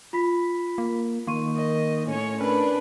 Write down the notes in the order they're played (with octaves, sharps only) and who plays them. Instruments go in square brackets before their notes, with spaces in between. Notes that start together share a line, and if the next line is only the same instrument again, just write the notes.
[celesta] F4 B5 B6
[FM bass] A#3
[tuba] D#3 [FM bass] A#3 [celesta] C6 C#6 D#7
[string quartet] D#5
[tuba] A2 [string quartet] C#4 C#5
[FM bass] C#4 [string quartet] D4 B4 [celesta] A#4 B5